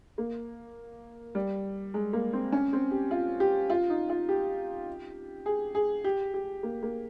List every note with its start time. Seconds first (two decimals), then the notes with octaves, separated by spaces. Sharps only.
0.18 A#3
1.35 G3
1.94 G#3
2.13 A#3
2.33 C4
2.52 C#4
2.73 C4
2.91 G4
3.11 F4
3.40 G4
3.70 F4
3.90 D#4
4.09 F4
4.29 G4
5.46 G#4
5.75 G#4
6.04 G4
6.34 G4
6.63 A#3
6.83 A#3